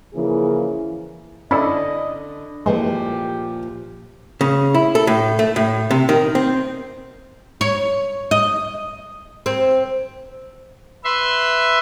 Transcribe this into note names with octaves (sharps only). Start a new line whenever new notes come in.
C#3 E3 F3 A#3 G#4
D3 C#4 E4 A4 D5 D#5 B5
A#2 E3 F3 G#3 A3 G4
C#3
E4
A4
A2
A3
A2
C3
D#3
C4
C#5
D#5
C4
B4 E5 C6